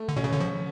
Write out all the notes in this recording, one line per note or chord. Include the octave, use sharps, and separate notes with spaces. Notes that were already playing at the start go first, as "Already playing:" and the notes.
Already playing: A3
D3
B2 C#4
C#3
D3
F3